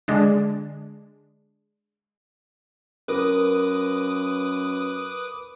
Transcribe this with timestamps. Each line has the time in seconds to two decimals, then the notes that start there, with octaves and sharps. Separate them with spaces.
0.08 D3 G#3 D4
3.08 F#2 A#4 B4 D6 D#6